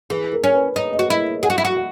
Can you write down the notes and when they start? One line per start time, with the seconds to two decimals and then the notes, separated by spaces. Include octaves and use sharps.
0.10 E3 G#4
0.33 A#4
0.44 C#4
0.54 B4
0.76 D#4 C#5
0.93 D#5
0.99 F#4
1.10 E4 D#5
1.43 G#4 F#5
1.50 F#4
1.58 E4
1.65 F#4
1.77 F#5